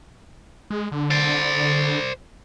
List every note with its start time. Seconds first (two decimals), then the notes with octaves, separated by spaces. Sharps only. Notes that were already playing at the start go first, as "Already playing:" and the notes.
0.70 G#3
0.92 D3
1.11 C5 D5